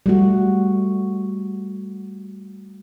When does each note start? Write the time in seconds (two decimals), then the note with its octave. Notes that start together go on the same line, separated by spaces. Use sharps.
0.06 G3 A3 F#4